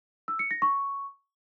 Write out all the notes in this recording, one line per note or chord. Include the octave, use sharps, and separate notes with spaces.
E6
C#7
A#6
C#6